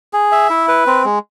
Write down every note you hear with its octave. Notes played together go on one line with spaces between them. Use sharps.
G#4
E5
E4
B4
C4
G#3